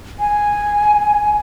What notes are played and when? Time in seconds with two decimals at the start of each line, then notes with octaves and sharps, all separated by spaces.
0.20 G#5